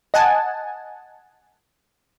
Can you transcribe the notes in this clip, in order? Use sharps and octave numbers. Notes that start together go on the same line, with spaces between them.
D#5 F#5 G#5 A5